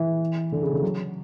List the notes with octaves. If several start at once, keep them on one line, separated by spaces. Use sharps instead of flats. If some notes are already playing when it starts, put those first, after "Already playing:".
Already playing: E3
D3
C#3
D3
F#3